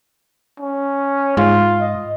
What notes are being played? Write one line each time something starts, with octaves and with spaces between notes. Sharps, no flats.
C#4
G#2 F4
D#5